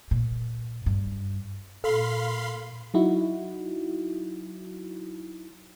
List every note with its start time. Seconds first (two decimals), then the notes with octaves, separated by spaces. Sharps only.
0.11 A#2
0.86 G2
1.84 A#2 A4 F5 B5 C6
2.94 F#3 D#4 E4 F#4